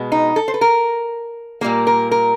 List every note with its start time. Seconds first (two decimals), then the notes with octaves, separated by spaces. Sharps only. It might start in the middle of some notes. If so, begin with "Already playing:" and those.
Already playing: B2 G#3 B3
0.12 D#4
0.36 A4
0.48 C5
0.54 B4
0.61 A#4
1.61 A#2 G3 A#3 A#4
1.87 A#4
2.11 A#4